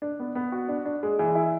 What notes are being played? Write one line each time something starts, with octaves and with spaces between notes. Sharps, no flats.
D4
B3
B3
F#4
D4
D4
G#3
E3
E4